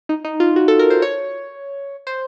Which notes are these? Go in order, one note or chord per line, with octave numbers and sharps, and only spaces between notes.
D#4
D#4
F4
F#4
A4
A#4
C5
C#5
C5